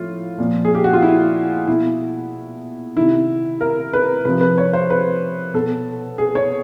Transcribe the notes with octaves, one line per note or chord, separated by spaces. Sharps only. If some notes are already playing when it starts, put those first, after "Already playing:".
Already playing: A2 F3 F4
A#2 F3
G#4
G4
F#4
F4
E4
B2 E4
C3 D#3 E4
A#4
B4
C3 F3 B4
B4
C#5
C5
B4
B2 A4
G#4
C#5